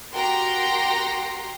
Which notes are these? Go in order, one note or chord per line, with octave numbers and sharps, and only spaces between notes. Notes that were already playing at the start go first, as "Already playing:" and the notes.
F#4 G4 A#4 G5 A#5 C6